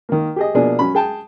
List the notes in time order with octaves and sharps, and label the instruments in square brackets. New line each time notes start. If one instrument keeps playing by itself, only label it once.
[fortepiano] D#3 A#3
G4 G#4 D#5
B2 F3 A#3 D4 G#4
F#3 C#4 B5
G#4 G5 A5